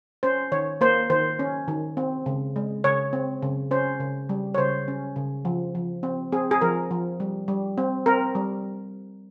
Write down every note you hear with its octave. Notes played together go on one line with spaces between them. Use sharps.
C#4 C5
D#3 C#5
A#3 C5
D#3 C5
C#4
D#3
C4
C#3
G#3
C#3 C#5
C4
C#3
C#4 C5
C#3
G3
C#5
C#3 C5
C#4
C#3
F3
F3
C4
C4 G#4
G#4
F3 A#4
F3
G3
G3
C4
C4 A#4
G3